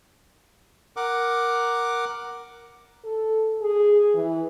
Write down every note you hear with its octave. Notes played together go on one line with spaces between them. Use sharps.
A#4 F#5 D6
A4
G#4
E3